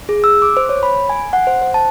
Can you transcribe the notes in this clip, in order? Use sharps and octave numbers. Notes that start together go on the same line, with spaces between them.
G#4
E6
D6
C5
C#5
B5
G#5
F#5
C5
C5
A5